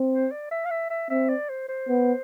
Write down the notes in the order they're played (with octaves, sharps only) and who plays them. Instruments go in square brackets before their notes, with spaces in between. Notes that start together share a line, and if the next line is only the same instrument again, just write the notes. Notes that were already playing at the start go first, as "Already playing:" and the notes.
Already playing: [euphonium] C4
[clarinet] C5
D5
E5
F5
E5
E5
[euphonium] C4 [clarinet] E5
[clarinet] D5
C5
C5
[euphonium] B3